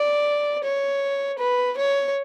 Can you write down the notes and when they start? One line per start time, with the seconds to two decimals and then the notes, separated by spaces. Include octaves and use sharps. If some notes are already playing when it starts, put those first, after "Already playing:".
Already playing: D5
0.64 C#5
1.39 B4
1.77 C#5